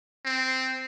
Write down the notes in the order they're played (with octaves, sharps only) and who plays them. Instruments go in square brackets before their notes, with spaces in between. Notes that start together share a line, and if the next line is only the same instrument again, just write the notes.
[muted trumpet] C4